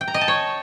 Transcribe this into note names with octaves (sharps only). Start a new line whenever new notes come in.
G5
A#5
D#5
A5
C#5